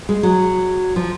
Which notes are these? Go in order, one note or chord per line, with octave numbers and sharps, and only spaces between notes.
G#3
F#3
F3